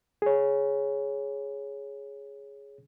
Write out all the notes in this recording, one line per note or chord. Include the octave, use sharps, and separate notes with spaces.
G#4 C#5